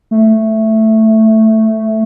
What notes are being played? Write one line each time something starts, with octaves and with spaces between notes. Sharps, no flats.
A3